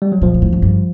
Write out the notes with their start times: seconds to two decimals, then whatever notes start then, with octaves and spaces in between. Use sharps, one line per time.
0.02 G3
0.12 F#3
0.22 A#2 F3
0.34 A#2
0.42 A2
0.53 G#2
0.62 G2